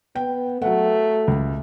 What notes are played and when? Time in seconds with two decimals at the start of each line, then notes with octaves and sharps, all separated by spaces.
0.16 B3 G5
0.62 F#3 A3 F#5
1.28 C#2